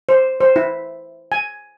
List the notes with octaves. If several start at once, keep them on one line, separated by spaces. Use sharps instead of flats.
C5
C5
E4
G#5